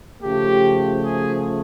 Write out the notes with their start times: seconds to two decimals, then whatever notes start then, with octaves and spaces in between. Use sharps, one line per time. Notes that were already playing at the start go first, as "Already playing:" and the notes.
0.21 C#3 F3 A3 G4
1.03 G#4